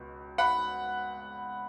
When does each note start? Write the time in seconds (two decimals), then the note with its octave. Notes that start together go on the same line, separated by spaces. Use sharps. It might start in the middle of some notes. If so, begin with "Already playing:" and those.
Already playing: C#2 B2
0.38 F#5 B5